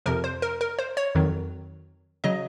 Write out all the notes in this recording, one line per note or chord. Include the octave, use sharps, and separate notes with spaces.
F2 C3 F3 A#4
C5
A#4
A#4
C5
C#5
F2 D#3 F#3
C#3 F#3 D#5